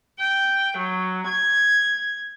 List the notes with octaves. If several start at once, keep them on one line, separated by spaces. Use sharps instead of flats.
G5
F#3
G#6